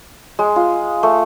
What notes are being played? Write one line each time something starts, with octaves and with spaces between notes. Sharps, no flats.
G#3
F4
A3